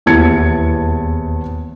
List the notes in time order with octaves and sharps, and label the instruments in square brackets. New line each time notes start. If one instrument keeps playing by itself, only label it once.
[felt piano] D#1 E2 E4 A5 G#6 C#7